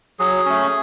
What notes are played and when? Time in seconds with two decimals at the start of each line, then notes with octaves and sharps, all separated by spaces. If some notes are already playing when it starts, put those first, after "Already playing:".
0.19 F#3 G#4
0.46 A3 C#4